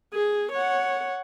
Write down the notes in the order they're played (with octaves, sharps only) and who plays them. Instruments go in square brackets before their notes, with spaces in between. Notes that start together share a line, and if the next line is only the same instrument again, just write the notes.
[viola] G#4
C#5 F#5